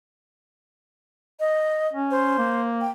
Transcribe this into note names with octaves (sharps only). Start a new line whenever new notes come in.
D#5
C#4
C5
A#3
G5